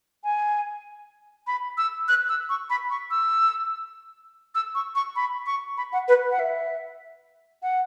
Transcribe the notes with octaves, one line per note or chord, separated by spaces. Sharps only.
G#5
B5
E6
F#6
E6
C#6
B5
C#6
E6
E6
C#6
C#6
B5
C#6
B5
F#5
B4
F#5
E5
F#5